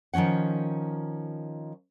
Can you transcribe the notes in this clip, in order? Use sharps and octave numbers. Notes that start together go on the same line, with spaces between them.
D#3 F3 F#3 C#4 F#5